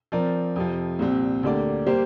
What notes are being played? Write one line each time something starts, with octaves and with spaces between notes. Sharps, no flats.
F3 C4 A#4 D5
F2 C3 F3
C2 A#2 G3 C4
D2 D3 A#3 G4 D5
G3 A#3 G4 C5